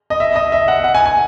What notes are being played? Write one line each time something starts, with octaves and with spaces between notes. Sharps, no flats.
D#5
E5
D#5
E5
F#5
F#5
G#5
G#5